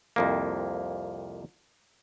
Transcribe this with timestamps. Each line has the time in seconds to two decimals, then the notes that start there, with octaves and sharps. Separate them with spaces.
0.16 C2 F2 A#3